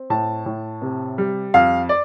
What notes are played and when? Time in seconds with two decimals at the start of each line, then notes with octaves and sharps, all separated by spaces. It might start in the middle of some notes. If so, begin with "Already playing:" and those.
Already playing: C4
0.10 A2 A5
0.46 A2
0.82 C3
1.18 G3
1.54 F2 F5
1.89 D5